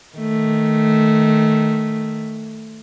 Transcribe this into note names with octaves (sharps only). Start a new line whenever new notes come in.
D#3 A3